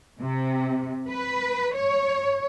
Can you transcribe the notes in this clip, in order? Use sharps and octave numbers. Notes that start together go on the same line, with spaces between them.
C3
B4
C#5